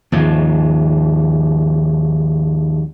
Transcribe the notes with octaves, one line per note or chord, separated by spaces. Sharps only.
D#2 G#2 F3